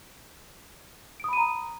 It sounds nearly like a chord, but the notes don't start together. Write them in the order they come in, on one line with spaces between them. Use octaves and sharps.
D7 D#6 B5 D#7 A#5